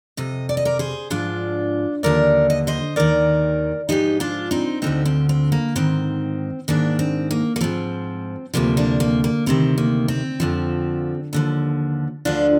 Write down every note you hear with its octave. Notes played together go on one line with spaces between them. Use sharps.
F2 C3 D#5
D5
D#5
A#4 D5
G#4 C5
G#2 F3 D4 F4
D#2 D3 F3 A#4 D5
D#5
C5 D#5
D#2 D#3 A#4 D5
G#2 F3 D#4 G4
D4 F4
C4 D#4
D2 D3 F3 C4 D#4
C4
C4
A#3
G#2 D#3 C4
G#2 D#3 A#3 D4
C4
A#3
A#3
G#2 F3 C4
D2 C3 F3 A#3
A#3 D4
A#3
A#3
D2 C3 D#3 C4
A#3
C4
F2 D3 F3
D#2 D3 F3
D2 D3 F3 D4 F4